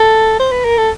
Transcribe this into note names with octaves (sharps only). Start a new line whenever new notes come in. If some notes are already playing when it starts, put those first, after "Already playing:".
Already playing: A4
C5
B4
A#4
A4